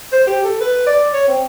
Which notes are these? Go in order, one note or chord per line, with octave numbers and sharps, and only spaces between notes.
C5
G4
A4
B4
D5
C#5
C4